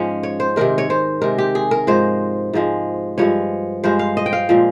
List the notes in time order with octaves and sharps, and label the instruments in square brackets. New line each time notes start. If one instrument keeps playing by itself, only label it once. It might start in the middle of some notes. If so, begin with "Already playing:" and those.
Already playing: [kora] G#2 F3 G#3 C#4
C#5
C5
C3 D#3 G#3 A#4
C#5
C5
C3 D#3 G#3 A#4
G4
G#4
A#4
G#2 F3 G#3 C5
G#2 F3 G#3
G2 F3 G#3 C#5
G2 F3 G#3 C5
F5
D#5
G5
F5
A#2 F3 G#3